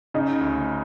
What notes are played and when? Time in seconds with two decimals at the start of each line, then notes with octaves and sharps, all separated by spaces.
0.14 C#3 D#4
0.41 D2